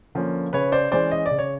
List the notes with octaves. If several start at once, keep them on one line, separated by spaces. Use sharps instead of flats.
D3 F3 A#3 C#4
C#3 B4 C#5
C5 D5
E3 G#3 C#4 C5 D5
D#5
D5
C#3
C#5